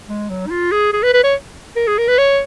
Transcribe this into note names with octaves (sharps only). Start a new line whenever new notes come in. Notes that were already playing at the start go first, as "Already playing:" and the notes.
G#3
F#3
D#4
F4
G#4
G#4
B4
B4
C#5
A#4
G#4
A#4
B4
C#5